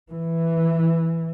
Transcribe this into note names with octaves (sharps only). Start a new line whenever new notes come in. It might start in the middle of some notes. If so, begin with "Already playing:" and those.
E3